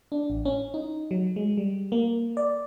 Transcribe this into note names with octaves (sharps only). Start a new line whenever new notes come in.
D4
A1
C#4
D#4
F#3
G#3
G3
A#3
D5